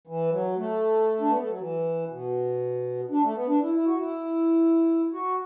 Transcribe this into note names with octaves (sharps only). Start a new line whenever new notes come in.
E3
F#3
A3
D4
B3
A3
F#3
E3
B2
D4
A3
B3
D4
E4
E4
F#4
E4
F#4